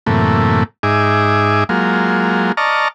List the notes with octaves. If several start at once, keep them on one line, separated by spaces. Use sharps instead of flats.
F#2 A2 C3 E3 A3 A#3
G#2 D#4 G#4 E5 D6
F#3 G#3 A#3 F4
D5 D#5 A5 A#5 C#6 F6